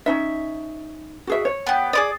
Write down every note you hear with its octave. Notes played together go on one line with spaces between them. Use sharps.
C#4 D#4 E5
F#4 G#4 E5
C#5
B3 G4
G#4 D5 D6 D#6